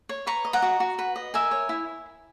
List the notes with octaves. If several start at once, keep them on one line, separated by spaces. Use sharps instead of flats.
C#5
B4 A#5 C#6
D#5
F#5 A#5
F#4
F#4
B4
D#5
A#4 E5 G#5
C#5
E4